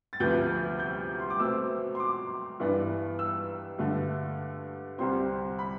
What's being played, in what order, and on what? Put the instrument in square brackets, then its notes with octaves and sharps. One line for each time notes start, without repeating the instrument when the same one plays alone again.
[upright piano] A6
D2 C3 F3 B3 G6
G6
C6
D6
B2 A3 C4 E6
C6
D6
G2 E3 B3 D4
E6
G2 D3 A3
C2 C3 G3 C4 C6
B5